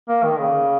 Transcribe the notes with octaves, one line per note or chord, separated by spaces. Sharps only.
A#3
D#3
C#3